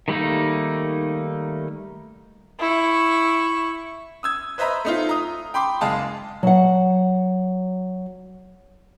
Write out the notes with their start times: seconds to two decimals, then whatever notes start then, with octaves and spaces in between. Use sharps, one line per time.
0.08 D#3 G3 A3 A#3 D#4
2.60 E4 C#6
4.23 D#6 E6 G#6
4.58 B4 C5 D#5 E5 A#5 B5
4.85 A3 D#4 F4
5.09 A#5 D#6
5.54 G5 B5 C6 D6
5.81 F#1 G#3 F5 A5 D#6
6.43 F#3 F#5